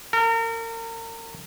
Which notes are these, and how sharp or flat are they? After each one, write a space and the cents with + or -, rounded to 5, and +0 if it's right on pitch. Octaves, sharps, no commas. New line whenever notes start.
A#4 -35